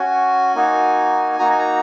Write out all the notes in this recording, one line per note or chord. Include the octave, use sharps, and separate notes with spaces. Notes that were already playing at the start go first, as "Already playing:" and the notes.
Already playing: C#4 F#4 G#5
A#3 D#4 F#4
A#3 D#4 F#4 A#5
G#5
A#5